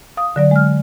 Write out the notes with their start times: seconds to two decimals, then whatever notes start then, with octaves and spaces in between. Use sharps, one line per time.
0.17 F5 D#6
0.36 D3 F#3 D5
0.51 G#3 F6